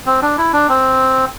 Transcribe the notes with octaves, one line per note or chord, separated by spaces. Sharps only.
C4
D4
E4
D4
C4